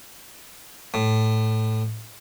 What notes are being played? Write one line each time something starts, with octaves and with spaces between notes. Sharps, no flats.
A2